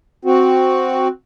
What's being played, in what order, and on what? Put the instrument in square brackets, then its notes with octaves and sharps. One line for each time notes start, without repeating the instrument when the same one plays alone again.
[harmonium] C4 F#4